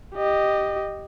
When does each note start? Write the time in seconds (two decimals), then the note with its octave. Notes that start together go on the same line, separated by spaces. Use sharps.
0.15 G4 D#5